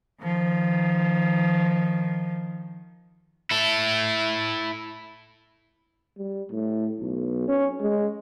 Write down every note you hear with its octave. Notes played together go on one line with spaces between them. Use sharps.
D#3 F3
E4 A4
G3
A2
B1
C#4
G#3